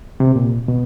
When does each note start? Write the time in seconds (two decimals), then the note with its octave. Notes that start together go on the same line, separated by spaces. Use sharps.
0.20 C3
0.36 A#2
0.68 B2